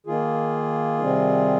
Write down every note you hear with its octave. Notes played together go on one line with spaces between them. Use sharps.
D#3 A#3 F4 G#4
C3 D#3 G3 C4